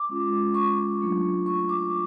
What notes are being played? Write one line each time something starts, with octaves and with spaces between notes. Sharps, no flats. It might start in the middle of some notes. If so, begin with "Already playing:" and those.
Already playing: D6
G#3 C#4 F4
C#6
F#3 A3 D4 F4
C#6
D6